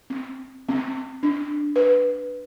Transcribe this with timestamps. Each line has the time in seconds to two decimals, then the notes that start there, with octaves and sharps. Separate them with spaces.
0.10 C4
0.69 C4
1.23 D4
1.76 B4